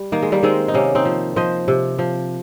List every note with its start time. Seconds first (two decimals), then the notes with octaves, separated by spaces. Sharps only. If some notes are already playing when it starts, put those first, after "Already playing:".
Already playing: G3
0.12 D#3 A#3
0.22 G#3
0.32 G3 A#3
0.43 D#3 G#3 C4
0.68 D#4
0.74 C3 A#3 C#4
0.95 C4 D#4
1.05 F3
1.36 F3 C5 D#5
1.68 C3
1.99 F3